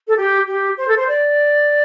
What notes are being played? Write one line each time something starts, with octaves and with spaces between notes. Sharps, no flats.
A4
G4
G4
C5
A4
C5
D5